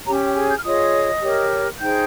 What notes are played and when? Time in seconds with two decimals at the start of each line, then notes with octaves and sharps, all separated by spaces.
0.06 C#4 G4 C#5 A#5
0.15 G#5
0.26 G5
0.34 G#4 G#5
0.43 G#6
0.51 G6
0.57 F6
0.64 F4 G#4 C#5 D#5 D#6
1.21 G4 A#4 C#5
1.79 D#4 G#4 C5 G5 G6